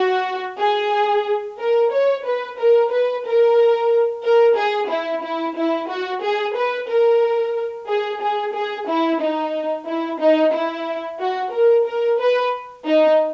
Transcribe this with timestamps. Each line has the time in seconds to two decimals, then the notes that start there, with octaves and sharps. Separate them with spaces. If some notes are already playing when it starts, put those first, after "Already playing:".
Already playing: F#4
0.59 G#4
1.58 A#4
1.92 C#5
2.25 B4
2.58 A#4
2.90 B4
3.25 A#4
4.24 A#4
4.56 G#4
4.89 E4
5.23 E4
5.57 E4
5.89 F#4
6.22 G#4
6.56 B4
6.89 A#4
7.88 G#4
8.21 G#4
8.54 G#4
8.88 E4
9.21 D#4
9.87 E4
10.20 D#4
10.53 E4
11.19 F#4
11.53 A#4
11.86 A#4
12.20 B4
12.86 D#4